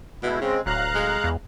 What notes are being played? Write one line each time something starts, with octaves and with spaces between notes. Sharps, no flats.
B2 G#3 A3 E4
C#3 G#3 C4
D1 F#3 F5 A#5 F#6
G#3
E2